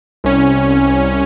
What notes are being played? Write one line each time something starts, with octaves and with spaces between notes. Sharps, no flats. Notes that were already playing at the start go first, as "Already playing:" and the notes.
C2 C#4